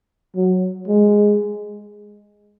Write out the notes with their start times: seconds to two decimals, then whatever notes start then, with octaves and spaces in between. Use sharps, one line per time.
0.36 F#3
0.88 G#3